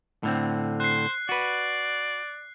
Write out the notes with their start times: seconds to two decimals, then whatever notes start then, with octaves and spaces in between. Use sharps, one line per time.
0.23 A2 D3 C4
0.80 C5 F#6 C7
1.29 F#4 B4 D5